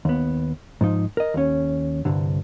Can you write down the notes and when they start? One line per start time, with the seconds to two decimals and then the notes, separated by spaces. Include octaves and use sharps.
0.05 D#2 B3
0.81 G#2 F3 D#4
1.17 A#4 D#5
1.34 D#2 C#4
2.05 C2 G2 D3